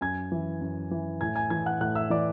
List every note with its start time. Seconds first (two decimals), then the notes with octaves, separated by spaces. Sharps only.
0.01 F#2 G#5 G#6
0.32 E3
0.61 F#2
0.91 E3
1.20 A2 G#5 G#6
1.36 G#5 G#6
1.50 E3 G#5 G#6
1.66 F#5 F#6
1.81 A2 F#5 F#6
1.95 E5 E6
2.10 E3 D5 D6